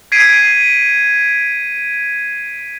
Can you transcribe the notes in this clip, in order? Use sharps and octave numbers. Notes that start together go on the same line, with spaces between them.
G#6 B6 C7 D7 D#7